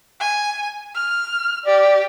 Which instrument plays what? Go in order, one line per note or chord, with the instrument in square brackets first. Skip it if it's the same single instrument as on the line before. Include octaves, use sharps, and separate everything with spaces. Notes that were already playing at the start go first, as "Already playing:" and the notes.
[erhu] G#5
F6
[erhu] G4 [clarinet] D5